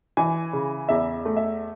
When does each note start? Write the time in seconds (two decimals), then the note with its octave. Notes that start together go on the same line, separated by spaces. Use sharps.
0.17 E3 G#5
0.53 C#3
0.89 E2 E5
1.25 A3
1.37 E5